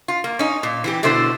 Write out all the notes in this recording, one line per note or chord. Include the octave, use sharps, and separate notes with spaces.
F4
A#3
C#4 D#4
A#2
E3 C4 G4
B2 D3 A3 E4 C5